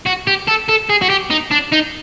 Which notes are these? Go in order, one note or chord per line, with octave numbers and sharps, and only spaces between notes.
F#4
G4
A4
A4
G#4
F#4
G4
D#4
D4
D#4